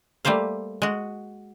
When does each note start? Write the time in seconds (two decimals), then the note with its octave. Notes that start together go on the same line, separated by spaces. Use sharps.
0.25 G3 A3 A#3 C5 F5
0.82 G#3 F#4